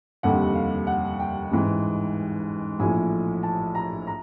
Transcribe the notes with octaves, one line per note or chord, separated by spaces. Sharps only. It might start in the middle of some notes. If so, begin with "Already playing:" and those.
F1 D#2 D3 G3 F#5
F5
F#5
G5
A1 G#2 E3
A#1 A2 F3 G#5
A5
A#5
A#5